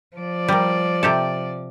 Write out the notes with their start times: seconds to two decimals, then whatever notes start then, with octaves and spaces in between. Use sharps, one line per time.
0.16 F3 D5
0.48 G3 A#4
1.03 C3 G4 A4